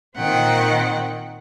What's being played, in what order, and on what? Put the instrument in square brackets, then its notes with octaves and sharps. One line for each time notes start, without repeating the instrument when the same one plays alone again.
[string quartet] A#2 D#3 C4 F#5 G5